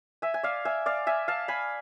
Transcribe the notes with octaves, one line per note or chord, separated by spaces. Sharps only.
E5 G#5
G#5
D5 F5
E5 G#5
D5 F5
E5 G#5
F5 A5
G#5 B5